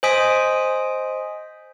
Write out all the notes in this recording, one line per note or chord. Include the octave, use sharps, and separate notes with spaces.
C5 D#5 G#5 D#6 B6 D7